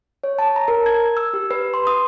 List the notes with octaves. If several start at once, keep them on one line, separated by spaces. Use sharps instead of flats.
C#5
A5
A#5
A#4
G#6
E6
G4
B4
C6
D#6